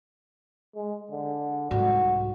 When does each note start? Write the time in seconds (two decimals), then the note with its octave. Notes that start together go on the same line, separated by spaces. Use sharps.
0.76 G#3
1.10 D3
1.71 C2 G#2 F#4